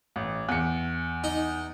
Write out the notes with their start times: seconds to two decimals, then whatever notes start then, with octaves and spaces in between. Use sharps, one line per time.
0.16 A1
0.49 E2 C#7
1.24 D#4